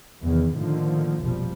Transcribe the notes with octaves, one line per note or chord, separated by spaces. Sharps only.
E2 C3 D#3 E3
A2 D3 D#3 F3 A#3
F1 A#1 B2 F3 G3